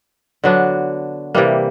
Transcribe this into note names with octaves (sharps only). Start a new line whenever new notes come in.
D3 F#3 B3 D4
C3 E3 G3 A#3